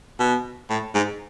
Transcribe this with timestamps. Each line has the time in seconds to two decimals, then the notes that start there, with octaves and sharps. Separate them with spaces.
0.19 B2
0.69 A2
0.94 G#2